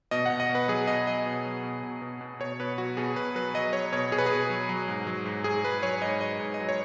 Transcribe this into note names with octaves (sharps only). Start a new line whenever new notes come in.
B2 D#5
B2 F#5
D#5
B2
B4
F#3 G#4
B2 D#5
F#3 D#5
B2
F#3
B2
B2
B2
B2
B2 C#5
B2 B4
F#3 F#4
B2 G#4
B2 B4
F#3 B4
F#3 D#5
F#3 C#5
B2 C#5
B2 G#4
B4
B2 G#4
F#3
F#3
G#2
F#3
G#2
G#2 G#4
G#2 B4
F#3 C#5
G#2 D#5
F#3 D#5
G#2
D#5
F#3
C#5